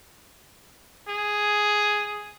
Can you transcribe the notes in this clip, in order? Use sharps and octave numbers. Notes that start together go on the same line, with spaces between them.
G#4